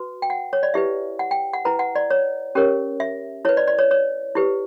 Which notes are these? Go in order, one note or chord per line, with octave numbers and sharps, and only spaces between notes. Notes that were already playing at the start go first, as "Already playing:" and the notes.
Already playing: F#4 B4
G5
F#5
C#5
D5
E4 G4 B4 E5
F#5
G5
F#5
E4 B4 A#5
F#5
D5
C#5
C#4 G4 A#4 C#5
E5
E4 B4 C#5
D5
D5
C#5
C#5
E4 G4 B4